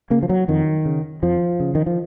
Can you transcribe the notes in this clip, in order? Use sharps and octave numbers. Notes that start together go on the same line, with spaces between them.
C#3 A#3
F3
F#3
F2 D#3
C#3
F2 F3
C#3
D#3
F3